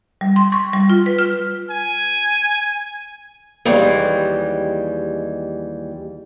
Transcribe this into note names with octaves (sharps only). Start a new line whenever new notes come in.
G3
C6
C#6
G3
F4
B4
F6
G#5
D#2 E3 G3 G#3